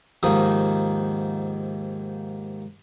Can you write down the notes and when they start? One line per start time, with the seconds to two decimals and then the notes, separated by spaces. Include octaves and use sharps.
0.23 D#2 G#2 D#3 F3 D#6